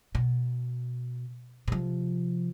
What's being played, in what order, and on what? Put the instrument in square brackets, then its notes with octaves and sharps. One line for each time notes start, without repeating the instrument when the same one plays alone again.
[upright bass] B2
C3 F3